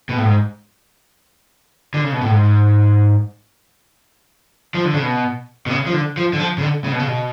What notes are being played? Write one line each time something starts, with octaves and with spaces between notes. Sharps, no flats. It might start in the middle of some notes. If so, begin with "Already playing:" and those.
B2
A2
G#2
D3
C#3
B2
A2
G#2
F3
D3
C#3
B2
B2
C#3
F3
D3
F3
D3
F3
C#3
D3
C#3
B2
C#3
B2